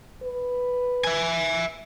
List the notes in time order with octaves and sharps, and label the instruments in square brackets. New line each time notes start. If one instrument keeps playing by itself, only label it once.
[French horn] B4
[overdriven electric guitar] E5 G#5